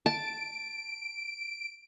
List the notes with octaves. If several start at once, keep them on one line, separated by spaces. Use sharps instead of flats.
A5 D7